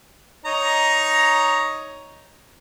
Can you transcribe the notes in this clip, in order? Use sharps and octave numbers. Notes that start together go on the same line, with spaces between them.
D#4 C#5 A#5